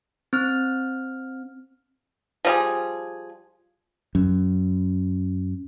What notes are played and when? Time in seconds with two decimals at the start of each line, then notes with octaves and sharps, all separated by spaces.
0.33 C4 F6
2.45 F3 G3 G#4
4.15 F#2